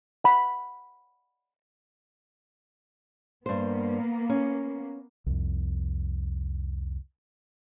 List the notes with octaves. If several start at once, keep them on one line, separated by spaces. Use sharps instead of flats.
F#5 B5
G2 A#3 B3 C5
C#4
C2 F2